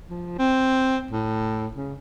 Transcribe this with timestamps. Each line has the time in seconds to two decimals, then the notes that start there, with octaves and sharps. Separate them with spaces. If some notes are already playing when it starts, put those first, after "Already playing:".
0.10 F3
0.38 C4
1.11 A2
1.75 C#3